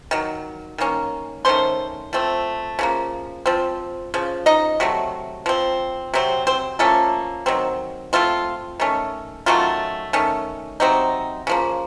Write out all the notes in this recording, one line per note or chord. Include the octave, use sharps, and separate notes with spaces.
D#3 F#3
D#3 A#3 C#4
D#3 A3 C#4 C5 C6
F3 A3 C4
C#3 F3 A#3
F3 C4
C#3 F3
D#4 D#5
C3 F#3 A3
F3 C4
C3 F#3 C4
C4 C5
F3 A3 A#3 C#4 A4
D#3 F#3 C4
F3 A3 C4 F4
D#3 A3 C#4
D#3 F#3 A3 C#4 F4
D#3 A3 C#4
C3 F#3 C4 D#4
C#3 F3 A#3